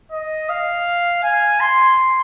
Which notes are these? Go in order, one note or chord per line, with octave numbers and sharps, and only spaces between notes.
D#5
F5
G#5
C6